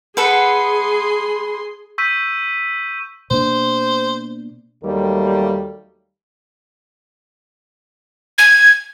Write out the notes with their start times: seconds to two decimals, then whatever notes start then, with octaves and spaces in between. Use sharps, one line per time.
0.17 G#4 A4 B4 F#5 C6
1.98 C#6 E6 G6 B6 D#7
3.31 B2 A#3 D4 C5
4.84 D#2 F#3 G3 A3 A#3 A4
8.38 G#6